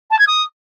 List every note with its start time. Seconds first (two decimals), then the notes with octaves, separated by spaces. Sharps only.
0.10 A5
0.19 G#6
0.27 D#6